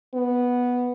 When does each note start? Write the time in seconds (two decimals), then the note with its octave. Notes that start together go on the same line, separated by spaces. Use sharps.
0.14 B3